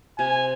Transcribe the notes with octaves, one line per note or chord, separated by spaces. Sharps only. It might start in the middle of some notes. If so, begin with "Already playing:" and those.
C3 G#5